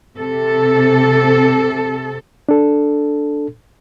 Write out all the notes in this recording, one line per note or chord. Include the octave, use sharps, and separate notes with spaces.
C3 A4
D4 A4